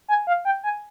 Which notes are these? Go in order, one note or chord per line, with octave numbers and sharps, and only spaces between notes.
G#5
F5
G5
G#5